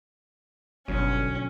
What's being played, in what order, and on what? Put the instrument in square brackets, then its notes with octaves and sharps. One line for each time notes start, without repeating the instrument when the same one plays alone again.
[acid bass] G1 [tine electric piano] B2 D3 F#3 [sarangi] C#4